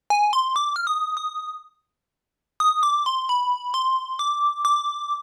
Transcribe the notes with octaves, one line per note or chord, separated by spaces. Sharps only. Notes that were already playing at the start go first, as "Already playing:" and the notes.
G#5
C6
D6
F6
D#6
D#6
D#6
D6
C6
B5
C6
D6
D6